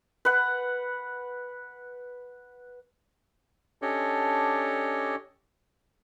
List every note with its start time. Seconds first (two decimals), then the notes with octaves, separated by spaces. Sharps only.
0.25 B4 F#5
3.82 C#4 D4 G4 A4 C#5 D#5